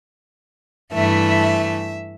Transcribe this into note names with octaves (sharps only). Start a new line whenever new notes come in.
G2 E3 A3 E5